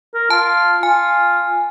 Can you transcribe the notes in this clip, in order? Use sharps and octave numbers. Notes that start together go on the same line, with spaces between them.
A#4
F4 A5
F4 G#5